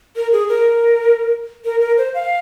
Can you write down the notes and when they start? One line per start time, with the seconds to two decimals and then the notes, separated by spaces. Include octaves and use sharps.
0.16 A#4
0.32 G#4
0.49 A#4
1.65 A#4
1.81 A#4
1.98 C5
2.14 F5